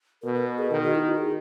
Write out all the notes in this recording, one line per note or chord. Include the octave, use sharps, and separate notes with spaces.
B2 A#4
A#4
B4
G#4
D#3 A#4
F#4
E4
F#4
G#4